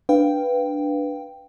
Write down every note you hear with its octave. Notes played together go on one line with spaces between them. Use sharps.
D4 B4 F5 G5